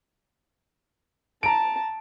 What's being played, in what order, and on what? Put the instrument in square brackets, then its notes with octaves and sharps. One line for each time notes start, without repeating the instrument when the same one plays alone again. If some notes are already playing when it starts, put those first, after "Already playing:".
[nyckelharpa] A5 [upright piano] A#5 D7